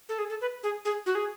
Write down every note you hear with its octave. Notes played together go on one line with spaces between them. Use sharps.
A4
G#4
A4
B4
G#4
G#4
F#4
G#4